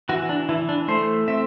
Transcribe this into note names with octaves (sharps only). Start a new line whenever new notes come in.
E3 F#4
D4
E3 E4
D4
A3 C5
C4 E5